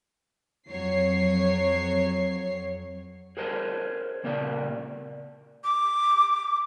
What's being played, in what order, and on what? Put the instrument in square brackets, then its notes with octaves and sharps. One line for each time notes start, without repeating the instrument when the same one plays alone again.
[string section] F2 F#3 C#5 C7
[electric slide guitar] G#4 A#4 C5 C#5 A5
A#2 C#3 A#3 A#4 D5 A5
[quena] D6